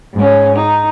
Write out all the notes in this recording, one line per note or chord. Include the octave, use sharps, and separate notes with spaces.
G#2 C#4
D#4